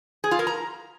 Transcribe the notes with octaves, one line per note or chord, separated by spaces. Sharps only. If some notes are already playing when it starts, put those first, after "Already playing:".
G#4
F4
A#4
A#5